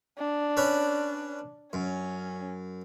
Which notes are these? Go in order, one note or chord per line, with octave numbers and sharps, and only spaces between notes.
D4
C#4 B4 C#5
F#2 C#4